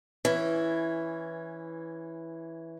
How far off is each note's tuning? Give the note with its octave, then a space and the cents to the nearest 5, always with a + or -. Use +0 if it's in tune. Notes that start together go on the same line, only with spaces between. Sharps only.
E3 +0 C#4 +0